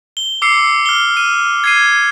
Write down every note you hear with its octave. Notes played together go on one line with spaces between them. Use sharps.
G7
D6 E6 C7 C#7
F6 G7
F6 D#7
G#6 C7 D#7